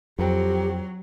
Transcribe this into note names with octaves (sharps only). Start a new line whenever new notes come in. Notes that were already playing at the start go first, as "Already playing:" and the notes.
F2 F#3 C4 G4